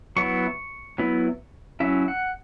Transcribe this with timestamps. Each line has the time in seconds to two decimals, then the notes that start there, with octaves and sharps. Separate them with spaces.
0.16 F#3 B3 E4 C#6
0.98 F#3 B3 E4
1.80 F#3 C#4 E4 E5
2.08 F#5